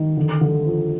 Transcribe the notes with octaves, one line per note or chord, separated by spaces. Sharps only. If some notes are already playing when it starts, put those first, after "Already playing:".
Already playing: D#3
D3
D3
F3